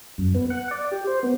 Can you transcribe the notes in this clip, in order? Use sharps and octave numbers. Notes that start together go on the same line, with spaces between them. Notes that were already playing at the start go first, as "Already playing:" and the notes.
F#2
B3
F#5
D5
G4
C5
B3